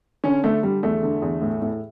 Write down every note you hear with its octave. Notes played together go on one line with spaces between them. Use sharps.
D3 C#4
D3 A3
D3 G3
E2 A3
D3
E2
A2
A2